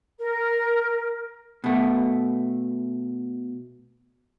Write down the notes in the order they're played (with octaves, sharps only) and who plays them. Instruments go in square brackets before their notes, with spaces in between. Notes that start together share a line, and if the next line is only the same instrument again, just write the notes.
[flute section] A#4
[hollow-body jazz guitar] B2 A3